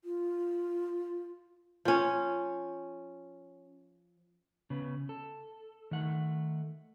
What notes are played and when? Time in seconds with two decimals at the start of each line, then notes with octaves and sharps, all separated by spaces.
0.04 F4
1.85 F3 C#4
4.70 C#3 B3
5.09 A4
5.91 D#3 A3 F#5